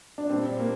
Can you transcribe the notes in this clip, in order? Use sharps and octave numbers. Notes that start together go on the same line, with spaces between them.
D4
A#2 G3 C4
A#3